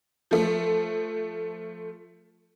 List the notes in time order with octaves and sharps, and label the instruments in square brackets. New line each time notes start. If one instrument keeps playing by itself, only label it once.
[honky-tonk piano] F3 A3